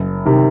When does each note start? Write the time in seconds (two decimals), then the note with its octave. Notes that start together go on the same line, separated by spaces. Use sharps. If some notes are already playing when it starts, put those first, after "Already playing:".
Already playing: F#1
0.25 C3 D#3